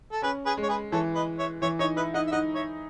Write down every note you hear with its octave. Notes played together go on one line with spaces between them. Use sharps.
A4
C#4 G#4 B4
G#4 B4
G#3
C#5
G#4 B4
E3 A4 C#5
B4 D#5
C#5 E5
E3 C#5 E5
D#4 C#5 E5
E4 B4 D#5
D#4 D#5 F#5
E5
D#4 D#5 F#5
C#5 E5